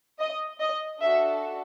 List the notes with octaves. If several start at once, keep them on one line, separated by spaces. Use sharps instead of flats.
D#5
D#5
D4 F#4 A4 E5